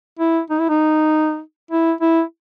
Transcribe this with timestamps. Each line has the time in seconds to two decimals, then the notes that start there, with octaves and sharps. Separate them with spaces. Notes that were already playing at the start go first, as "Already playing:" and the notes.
0.19 E4
0.50 D#4
0.60 E4
0.69 D#4
1.71 E4
2.01 E4